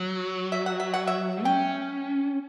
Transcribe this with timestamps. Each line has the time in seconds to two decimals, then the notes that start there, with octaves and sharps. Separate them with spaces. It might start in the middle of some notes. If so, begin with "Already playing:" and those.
Already playing: F#3
0.52 E5
0.66 F#5
0.80 E5
0.94 F#5
1.07 E5
1.45 C#4 G5